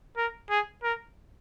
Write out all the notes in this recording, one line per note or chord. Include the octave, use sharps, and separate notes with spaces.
A#4
G#4
A#4